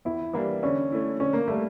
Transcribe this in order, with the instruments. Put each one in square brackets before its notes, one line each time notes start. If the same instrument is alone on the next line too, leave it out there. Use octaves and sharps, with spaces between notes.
[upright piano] E2 [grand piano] E4
[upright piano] E3 G3 A#3 D4
[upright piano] D3 [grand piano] C#4
[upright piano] A3 E4
[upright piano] D3 [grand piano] C#4
[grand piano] A#3
[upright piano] G3 A#3 [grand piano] A3